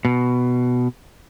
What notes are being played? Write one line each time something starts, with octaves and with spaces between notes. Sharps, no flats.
B2